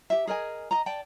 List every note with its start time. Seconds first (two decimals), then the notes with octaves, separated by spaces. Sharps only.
0.10 G4 E5
0.27 G#4 A#4 D#5 G#5
0.71 D#5 A#5
0.86 D5 G5 A5